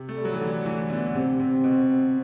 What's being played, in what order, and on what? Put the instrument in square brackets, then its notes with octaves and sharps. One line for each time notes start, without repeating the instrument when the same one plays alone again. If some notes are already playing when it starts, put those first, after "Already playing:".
Already playing: [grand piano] C3
A3
[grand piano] G3 [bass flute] A4
[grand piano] F#3
E3
[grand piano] D3 [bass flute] G4
[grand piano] E3 [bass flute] A3
[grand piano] D3 [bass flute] B3
[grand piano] C3 [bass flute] C4
[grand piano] C3
B2